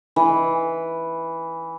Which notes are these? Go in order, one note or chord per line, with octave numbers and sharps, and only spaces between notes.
E3